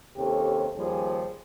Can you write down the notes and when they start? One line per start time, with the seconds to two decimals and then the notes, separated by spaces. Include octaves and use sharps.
0.17 D#2 C3 C#4 G4 A4
0.77 D#2 F3 G3 G#4